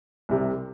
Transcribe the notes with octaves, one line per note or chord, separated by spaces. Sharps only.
C2 C3 G3